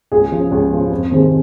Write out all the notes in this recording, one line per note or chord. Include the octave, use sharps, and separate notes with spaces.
C#2 G#4
C#3 F3
C#2
C#3 F3
F2
C3 D#3 G#3 C4